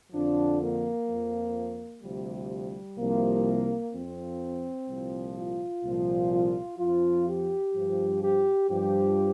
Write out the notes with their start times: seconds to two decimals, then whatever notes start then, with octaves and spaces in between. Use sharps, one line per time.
0.12 F2 D3 F3 D4
0.60 A#3
1.07 F2 F3
2.02 D2 C3 F3 G3
2.98 C2 C3 F3 A#3
3.92 F2 F3 C4
4.87 C2 A#2 F3
5.35 F4
5.84 C2 A#2 F3
6.31 F4
6.78 F2 F3 F4
7.26 G4
7.74 G2 F3
8.22 G4
8.69 G2 F3 G4